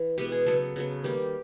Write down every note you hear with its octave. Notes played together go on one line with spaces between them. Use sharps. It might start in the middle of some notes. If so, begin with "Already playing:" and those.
Already playing: E3
B2 G#3 B3 G4
G#4
C#3 F#3 B3 A4
C#3 F#3 B3
D#3 G3 A#3 G4